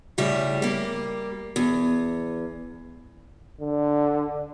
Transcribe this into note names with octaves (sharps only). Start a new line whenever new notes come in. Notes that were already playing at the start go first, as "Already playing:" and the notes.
A2 C#3 G3 E5
G3 A#3
E2
D3